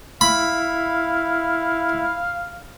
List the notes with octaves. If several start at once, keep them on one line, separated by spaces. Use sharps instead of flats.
E4 F5 B5